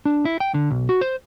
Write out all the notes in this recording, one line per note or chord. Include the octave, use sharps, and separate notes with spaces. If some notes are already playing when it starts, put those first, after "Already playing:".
D4
E4
G5
D3
B1
F#4
C5